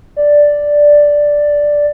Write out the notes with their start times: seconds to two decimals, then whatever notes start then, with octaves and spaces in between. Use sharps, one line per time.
0.16 D5